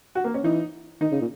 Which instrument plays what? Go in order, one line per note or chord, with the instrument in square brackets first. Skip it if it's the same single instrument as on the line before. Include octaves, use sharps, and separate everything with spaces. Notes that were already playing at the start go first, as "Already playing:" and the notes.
[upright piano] F#4
A#3
C#4
[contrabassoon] E3 [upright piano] D#4
[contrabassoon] D#3 [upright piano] D#4
[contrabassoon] C#3
A#2